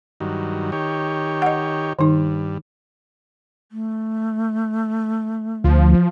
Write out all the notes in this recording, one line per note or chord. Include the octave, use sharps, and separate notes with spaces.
G2 D#3 F#3
D#3 G4 C#5
D#5 F#5
G2 D#3 D#4
A3
D2 F3